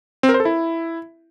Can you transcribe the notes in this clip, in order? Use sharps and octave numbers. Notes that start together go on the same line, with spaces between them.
C4
A#4
C5
A4
E4